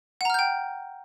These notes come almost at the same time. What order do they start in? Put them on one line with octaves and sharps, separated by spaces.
F#5 A#5 F6 G6 G5